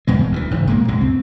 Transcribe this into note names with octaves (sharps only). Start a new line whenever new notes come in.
F1 E2 B2 G#3
D2 D#3 E3
F#1 G#2
A#2 G#3 A#3
C#2 F#2 C3 G#3
C4